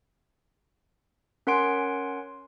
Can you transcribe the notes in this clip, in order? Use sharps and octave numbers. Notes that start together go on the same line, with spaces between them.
C#4 A#4 F#5 G#5 C6 D7